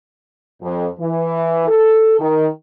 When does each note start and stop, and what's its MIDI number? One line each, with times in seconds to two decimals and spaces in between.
0.62 0.87 41
0.99 1.68 52
1.68 2.18 69
2.19 2.46 51